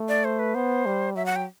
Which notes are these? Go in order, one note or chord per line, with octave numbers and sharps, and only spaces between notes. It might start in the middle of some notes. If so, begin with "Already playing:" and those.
Already playing: A3
D5
C5
B4
B3 C5
G3
F#3 E5
F#5
G5